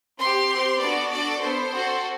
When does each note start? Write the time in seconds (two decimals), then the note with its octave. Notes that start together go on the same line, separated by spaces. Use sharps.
0.20 C4 G4 C6
0.51 C4 G4
0.81 B3 D4 F#4 A4 D5
1.12 D4 F#4 A4 D5
1.42 B3 D4 A4 C5
1.73 C4 F#4 A4